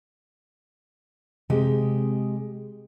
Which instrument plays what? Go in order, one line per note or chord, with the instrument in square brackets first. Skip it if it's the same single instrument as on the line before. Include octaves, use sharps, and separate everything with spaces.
[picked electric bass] C3 C4 [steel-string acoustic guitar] G#3 G4 D#5